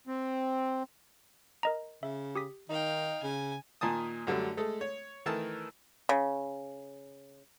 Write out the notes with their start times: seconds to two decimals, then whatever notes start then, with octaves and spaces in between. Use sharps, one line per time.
0.07 C4
1.63 A#4 D#5 A#5
2.03 C#3 E5
2.35 G4 D#6 B6
2.69 D#3 D#4 F5 G5
3.23 C#3 G#5
3.81 A#2 D#3 G#5 A5 D#6
4.27 F#2 D3 G3 A3
4.57 G#3 A3 A4
4.81 C#5
5.26 D#3 E3 A3 A#4 A5 E6
6.09 C#3